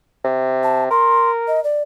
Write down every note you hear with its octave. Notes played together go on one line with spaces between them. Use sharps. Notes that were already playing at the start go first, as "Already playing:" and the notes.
C3
A5
A#4 C6
D#5
D5